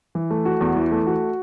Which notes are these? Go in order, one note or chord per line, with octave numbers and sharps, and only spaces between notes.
E3
A3
F#4
E2
E3
A3
F#4